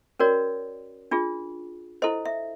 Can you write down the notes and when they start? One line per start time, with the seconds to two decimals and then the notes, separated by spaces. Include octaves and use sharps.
0.20 C#4 F#4 A#4 C#5 D5
1.11 D4 F4 G#4
2.02 E4 A4 C5 D#5
2.25 E5